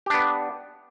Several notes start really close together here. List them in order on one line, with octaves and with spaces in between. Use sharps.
G4 D4 B3